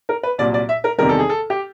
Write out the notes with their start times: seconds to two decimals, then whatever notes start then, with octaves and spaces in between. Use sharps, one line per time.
0.09 A#4
0.23 B4
0.38 C2 A#2 F#3 D5
0.54 D5
0.69 E5
0.84 A#4
0.98 E2 C3 D#3 G3 A#4
1.09 A4
1.19 G#4
1.29 A4
1.50 G4